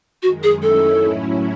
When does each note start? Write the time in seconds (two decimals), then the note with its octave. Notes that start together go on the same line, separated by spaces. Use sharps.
0.23 F#2 D#3 G#3 F#4
0.43 G#4
0.62 F#2 D#3 A3 C#4 E4 A4
1.02 A2 F#3 C#4 E4